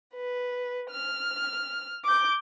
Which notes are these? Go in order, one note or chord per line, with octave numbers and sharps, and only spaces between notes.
B4
F6
D6 G6